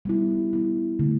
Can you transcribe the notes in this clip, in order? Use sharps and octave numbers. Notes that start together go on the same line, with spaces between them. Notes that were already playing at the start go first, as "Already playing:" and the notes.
G3 B3 E4
G3 B3 E4
D3 A3 D4